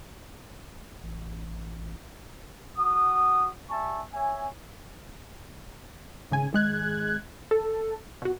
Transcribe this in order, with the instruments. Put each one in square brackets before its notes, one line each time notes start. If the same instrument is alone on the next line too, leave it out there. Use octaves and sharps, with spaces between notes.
[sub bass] A1
[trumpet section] F#4 F#5 D#6
G3 E5 G#5 A5 C#6
C#5 E5 G#5
[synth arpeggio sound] G#1 C#3 G#5
G#1 G#3 F#6 G#6
A4
B2 F#4